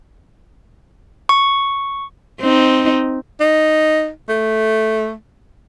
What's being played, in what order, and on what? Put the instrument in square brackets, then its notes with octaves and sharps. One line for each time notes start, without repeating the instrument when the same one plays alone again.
[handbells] C#6
[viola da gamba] C4 D#4
[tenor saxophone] D#4
A3